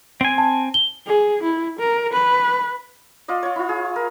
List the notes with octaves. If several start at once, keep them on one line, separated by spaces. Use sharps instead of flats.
C4 G#5
A5
G7
G#4
E4
A#4
B4
F4 D5 D#5
F4 C#5
E4 F4
G#4
A#4